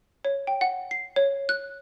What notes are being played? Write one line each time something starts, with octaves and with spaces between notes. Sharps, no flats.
C#5
G5
F#5
C7
C#5
F#6